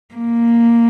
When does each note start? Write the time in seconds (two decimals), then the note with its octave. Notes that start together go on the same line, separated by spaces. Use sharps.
0.14 A#3